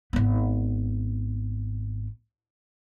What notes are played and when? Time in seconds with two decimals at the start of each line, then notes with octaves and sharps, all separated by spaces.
0.13 G#1 B3